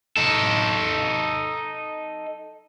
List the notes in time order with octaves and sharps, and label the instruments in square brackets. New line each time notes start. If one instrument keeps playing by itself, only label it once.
[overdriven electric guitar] D#4 A4